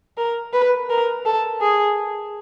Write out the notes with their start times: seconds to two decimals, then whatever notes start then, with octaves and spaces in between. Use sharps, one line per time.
0.17 A#4
0.53 B4
0.90 A#4
1.25 A4
1.61 G#4